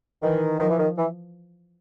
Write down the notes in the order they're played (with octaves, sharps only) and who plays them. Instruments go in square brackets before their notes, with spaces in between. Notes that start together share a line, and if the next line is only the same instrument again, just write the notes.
[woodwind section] D#3 [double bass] E3
[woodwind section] D#3 [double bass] F3
[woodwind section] E3
D#3
E3